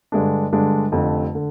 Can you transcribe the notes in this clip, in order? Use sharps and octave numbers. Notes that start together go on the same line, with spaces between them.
G2 D3 G#3 D4
G2 D3 G#3 D4
F1 F2 D3
D3